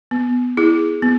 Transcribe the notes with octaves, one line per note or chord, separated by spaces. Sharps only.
B3
E4 G#4
B3